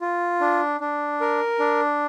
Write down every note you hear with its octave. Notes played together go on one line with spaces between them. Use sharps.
F4
D4
D4
A#4
D4